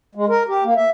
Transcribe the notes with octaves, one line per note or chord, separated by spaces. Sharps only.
G#3
A#4
G4
A#3
E5